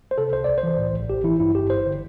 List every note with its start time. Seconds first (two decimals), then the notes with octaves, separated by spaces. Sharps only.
0.11 C5
0.18 C3 A4
0.33 C2 C5
0.44 C2 D5
0.58 C5
0.63 E3
0.78 A2
0.93 A1
1.10 A1 G4
1.24 E3 E4
1.40 G2 E4
1.55 G1 G4
1.70 G1 C5
1.86 D3